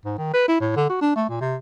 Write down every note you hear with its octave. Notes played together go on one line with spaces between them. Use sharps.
G#2
D#3
B4
E4
A2
D3
F#4
D4
A3
A#2
C3